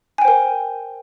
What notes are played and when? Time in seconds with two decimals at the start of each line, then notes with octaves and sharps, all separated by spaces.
0.18 G#5
0.22 G5
0.25 C5
0.28 A#4